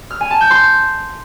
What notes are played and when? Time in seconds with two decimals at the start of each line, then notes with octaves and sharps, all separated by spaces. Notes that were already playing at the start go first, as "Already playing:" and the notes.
0.11 F6
0.21 G#5
0.31 A5
0.41 G6
0.51 C6